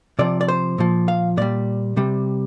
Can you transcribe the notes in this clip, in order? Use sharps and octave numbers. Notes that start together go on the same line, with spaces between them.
C3 F3 D5
D5
C5
A#2 F3
F5
A#2 G3 D5
C3 G3